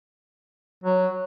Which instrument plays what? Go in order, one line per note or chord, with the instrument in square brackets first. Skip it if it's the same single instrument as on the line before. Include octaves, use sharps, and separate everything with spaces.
[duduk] F#3